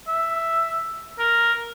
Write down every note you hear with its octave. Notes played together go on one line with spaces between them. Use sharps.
E5
A#4